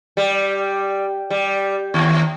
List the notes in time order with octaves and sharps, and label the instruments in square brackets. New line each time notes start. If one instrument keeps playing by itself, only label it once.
[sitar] G3
G3
D#2